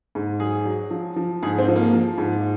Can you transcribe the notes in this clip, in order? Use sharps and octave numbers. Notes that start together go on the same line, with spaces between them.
G#2
F#3 G#4
F#3
F3
F3
G#2 G#4
C4
F3
A#3
F3
G#2